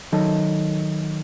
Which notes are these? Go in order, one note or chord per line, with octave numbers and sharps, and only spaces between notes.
D#3 F#3 A4 D#5 A5